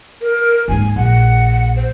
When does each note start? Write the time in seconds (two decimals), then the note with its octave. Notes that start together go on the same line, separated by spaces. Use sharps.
0.22 A#4
0.68 D#2 G#2 G#5
0.96 A#1 F#5
1.76 C5